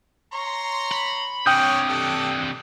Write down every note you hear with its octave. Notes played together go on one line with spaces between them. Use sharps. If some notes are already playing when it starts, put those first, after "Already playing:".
C#5 A#5 C6
B5
C3 C#4 D4 G5 D#6 G6
G4 A4